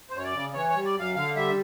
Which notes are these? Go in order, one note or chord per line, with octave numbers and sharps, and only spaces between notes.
C5
F#2 C#5
D5
C#3
E3 C#5
C#5
G3
D5
F#2 F5
D3 F5
G3 E5